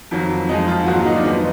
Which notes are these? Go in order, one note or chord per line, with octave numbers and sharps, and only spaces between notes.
F2 D#3 F#3
F2 F3 G#3 D#4
F4
G#2 D#3 F#3 A#3 F#4
F4
D#4
D4
F2 D#3 G#3 B3 D#4